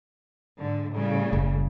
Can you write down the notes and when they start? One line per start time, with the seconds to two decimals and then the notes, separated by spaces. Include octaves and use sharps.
0.58 G#2 D3
0.92 A2 C#3 G3
1.33 F#1